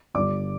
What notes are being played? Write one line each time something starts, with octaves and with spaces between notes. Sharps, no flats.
G1 G2 D3 D5 D6